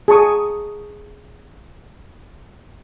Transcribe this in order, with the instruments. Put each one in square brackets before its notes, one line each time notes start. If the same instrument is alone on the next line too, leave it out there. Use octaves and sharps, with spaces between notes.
[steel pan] G#4 A5 A#5 C#6 D#6